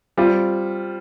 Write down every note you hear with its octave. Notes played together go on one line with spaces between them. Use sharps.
G3 C4 F4